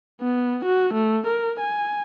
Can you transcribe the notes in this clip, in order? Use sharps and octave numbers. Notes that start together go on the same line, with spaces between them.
B3
F#4
A3
A#4
G#5